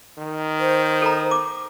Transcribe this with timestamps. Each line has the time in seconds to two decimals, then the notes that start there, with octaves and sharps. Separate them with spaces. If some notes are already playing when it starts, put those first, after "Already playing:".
0.18 D#3
0.60 C5
1.02 A4 A#5
1.31 D6